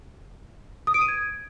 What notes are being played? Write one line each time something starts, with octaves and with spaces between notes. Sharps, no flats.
D#6
D7
D#7
G#6